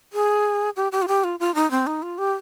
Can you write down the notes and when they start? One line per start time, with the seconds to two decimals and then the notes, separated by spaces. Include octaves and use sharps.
0.13 G#4
0.76 G4
0.92 G4
1.02 F4
1.08 G4
1.24 F4
1.40 F4
1.55 D#4
1.71 C4
1.87 D#4
2.02 F4
2.18 G4